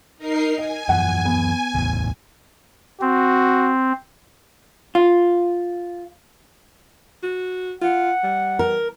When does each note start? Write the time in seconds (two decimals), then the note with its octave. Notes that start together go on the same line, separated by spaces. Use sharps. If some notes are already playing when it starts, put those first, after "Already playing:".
0.18 D#4 A#4 C7
0.58 D#5 G#5
0.89 F#2 E3 F3 F#5
1.25 B3
1.75 D1 A1 E2
3.01 C4 F#4
4.95 F4
7.23 F#4
7.81 F4 F#5
8.24 G3
8.59 A#4